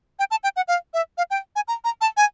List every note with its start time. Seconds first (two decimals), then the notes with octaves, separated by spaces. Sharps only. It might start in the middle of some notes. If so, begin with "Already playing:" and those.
0.19 G5
0.31 A5
0.44 G5
0.56 F#5
0.68 F5
0.94 E5
1.18 F5
1.31 G5
1.56 G#5
1.68 A#5
1.84 A#5
2.01 A5
2.17 G#5